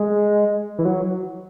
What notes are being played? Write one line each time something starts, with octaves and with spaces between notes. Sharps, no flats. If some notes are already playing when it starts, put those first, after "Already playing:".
Already playing: G#3
E3
F#3